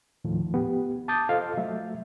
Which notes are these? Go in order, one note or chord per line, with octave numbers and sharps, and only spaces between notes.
D#2 A2 D#3 F3
B3 G4
A5 D6 D#6 G6 A6
F4 A4 C5 D#5 F5
F#3 A3 E5